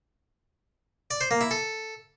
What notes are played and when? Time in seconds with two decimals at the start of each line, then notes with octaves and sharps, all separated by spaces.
1.11 D5
1.21 C5
1.31 A#3
1.41 E4
1.51 A4